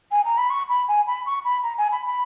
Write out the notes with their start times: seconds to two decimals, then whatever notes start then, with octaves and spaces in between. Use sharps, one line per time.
0.11 G#5
0.25 A#5
0.37 B5
0.50 C#6
0.69 B5
0.88 G#5
1.07 B5
1.26 C#6
1.44 B5
1.63 A#5
1.78 G#5
1.92 B5
2.06 B5